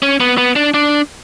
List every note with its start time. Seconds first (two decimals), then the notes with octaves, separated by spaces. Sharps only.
0.02 C#4
0.20 B3
0.38 B3
0.56 D4
0.74 D4